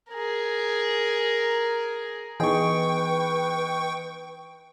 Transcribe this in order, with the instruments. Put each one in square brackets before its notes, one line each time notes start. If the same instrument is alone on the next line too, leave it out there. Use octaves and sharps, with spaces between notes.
[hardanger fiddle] G#4 A#4
[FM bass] E3 [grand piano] B3 D#4 G#4 [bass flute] B4 [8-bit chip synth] G5 C#6